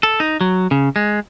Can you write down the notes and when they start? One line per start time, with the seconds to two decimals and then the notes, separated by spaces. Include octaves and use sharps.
0.03 A4
0.20 D#4
0.41 F#3
0.71 C#3
0.96 G#3